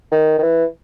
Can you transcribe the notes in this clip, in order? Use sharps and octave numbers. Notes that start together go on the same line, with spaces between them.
D#3
D#3
E3